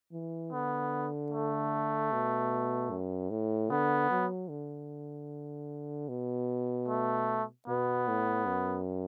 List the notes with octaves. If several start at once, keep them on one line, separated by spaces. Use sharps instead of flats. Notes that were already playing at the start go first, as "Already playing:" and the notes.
E3
D3 B3
A3
B2
F#2
A2
D3 B3
F#3
D3
B2
A3
B2 B3
A2
F#2